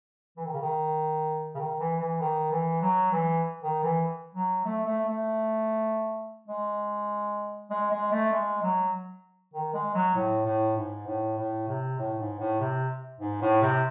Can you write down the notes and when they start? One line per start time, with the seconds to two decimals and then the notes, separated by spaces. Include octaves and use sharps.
0.37 E3
0.45 D#3
0.53 C#3
0.61 D#3
1.55 C#3
1.59 D#3
1.80 E3
2.00 E3
2.20 D#3
2.51 E3
2.82 F#3
3.12 E3
3.63 D#3
3.83 E3
4.35 F#3
4.65 A3
4.85 A3
5.05 A3
6.48 G#3
7.70 G#3
7.91 G#3
8.12 A3
8.32 G#3
8.62 F#3
9.54 D#3
9.74 G#3
9.94 F#3
10.15 A2
10.45 A2
10.76 G#2
11.07 A2
11.37 A2
11.68 C3
11.99 A2
12.19 G#2
12.39 A2
12.59 C3
13.20 G#2
13.41 A2
13.62 C3